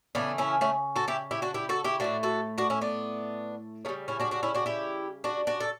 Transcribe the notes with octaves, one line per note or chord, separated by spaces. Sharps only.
C#3 E3 A3 B3 D4
C#4 E4
A3 C#4
F#4 A4
E4 G4
E4 G4
D4 F#4
E4 G4
F#4 A4
E4 G4
A2 E3 A3 D4 F#4
F#4 A4
D4 F#4
C#4 E4
B3 D4
C#3 G3 A3 C#4
C#4 E4
D4 F#4
D4 F#4
C#4 E4
D4 F#4
E4 G4
D4 F#4
D4 F#4
A4